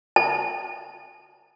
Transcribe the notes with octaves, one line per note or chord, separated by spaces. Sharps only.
A5